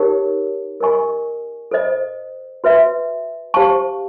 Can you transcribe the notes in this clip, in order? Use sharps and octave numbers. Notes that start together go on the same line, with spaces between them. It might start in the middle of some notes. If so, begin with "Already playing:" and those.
Already playing: D#4 G4 A#4 C#5 F#5
A#4 D#5 G#5 C#6
A4 C5 D#5
F#4 B4 E5
G4 C5 F5 A5 C#6